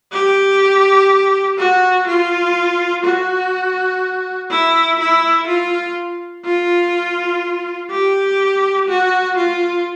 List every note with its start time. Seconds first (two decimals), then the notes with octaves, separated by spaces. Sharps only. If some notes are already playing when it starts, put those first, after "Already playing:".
0.13 G4
1.58 F#4
2.07 F4
3.04 F#4
4.50 E4
4.99 E4
5.47 F4
6.45 F4
7.91 G4
8.89 F#4
9.37 F4